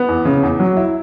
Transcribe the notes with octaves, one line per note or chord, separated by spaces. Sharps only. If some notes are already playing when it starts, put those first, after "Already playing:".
Already playing: B3
E2
C#3
E2
F#3
E4